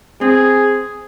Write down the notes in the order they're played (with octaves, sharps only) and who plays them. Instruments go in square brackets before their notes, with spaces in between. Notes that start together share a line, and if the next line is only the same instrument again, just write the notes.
[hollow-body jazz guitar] C4 [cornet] G#4